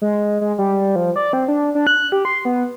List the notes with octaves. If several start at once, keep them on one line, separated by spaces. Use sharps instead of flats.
G#3
G#3
G3
F3
D5
C4
D4
D4
F#6
G4
C6
B3